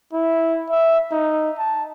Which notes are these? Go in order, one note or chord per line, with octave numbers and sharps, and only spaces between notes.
E4
E5
D#4
A5